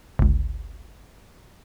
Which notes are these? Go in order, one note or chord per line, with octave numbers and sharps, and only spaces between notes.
G1 C#2